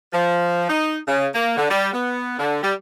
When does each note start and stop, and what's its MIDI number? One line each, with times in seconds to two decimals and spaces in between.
0.13 0.68 53
0.68 0.98 63
1.07 1.26 49
1.34 1.56 58
1.57 1.67 50
1.70 1.89 55
1.93 2.37 59
2.38 2.60 50
2.62 2.73 55